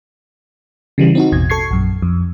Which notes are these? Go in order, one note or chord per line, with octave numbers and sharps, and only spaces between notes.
C#3 E3 G3
C4 D#4 F#4
A1 E2 B2 G#6
A4 C#6 G#6 C7
A#1 F#2
F2